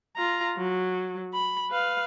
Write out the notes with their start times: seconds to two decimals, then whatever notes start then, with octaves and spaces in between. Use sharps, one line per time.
0.16 F4 A#5
0.58 F#3
1.34 B5
1.70 B4 F5